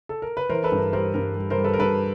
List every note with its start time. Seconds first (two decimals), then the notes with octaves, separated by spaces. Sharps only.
0.09 A4
0.22 A#4
0.37 B4
0.49 E3 A#4 C5
0.64 A4 B4
0.72 G2
0.78 A#4
0.93 G3 A#4 C5
1.14 G2 A#4
1.36 G3
1.50 A#4 C5
1.58 G3
1.64 A4 B4
1.74 A#4
1.79 G2 A4 B4